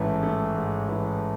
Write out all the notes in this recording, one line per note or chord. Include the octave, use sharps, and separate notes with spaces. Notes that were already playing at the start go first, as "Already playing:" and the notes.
Already playing: A1 G#2 E3 A3
A3
G#2
E3